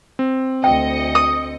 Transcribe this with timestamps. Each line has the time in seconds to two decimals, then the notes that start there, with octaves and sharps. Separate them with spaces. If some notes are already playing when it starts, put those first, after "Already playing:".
0.19 C4
0.64 D2 D#5 G5 C#7
1.15 D#6